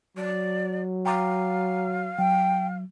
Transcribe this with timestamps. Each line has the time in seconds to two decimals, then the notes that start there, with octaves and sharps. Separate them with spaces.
0.17 F#3 D5
1.06 F5 G5 A#5 D6
2.19 F#3 G5